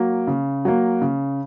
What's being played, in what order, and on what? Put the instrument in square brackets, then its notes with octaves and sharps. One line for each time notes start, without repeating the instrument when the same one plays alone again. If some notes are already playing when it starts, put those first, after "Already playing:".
Already playing: [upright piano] F#3 A#3
C#3
F#3 A#3
C#3